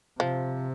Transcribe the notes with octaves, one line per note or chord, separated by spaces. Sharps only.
C3 F3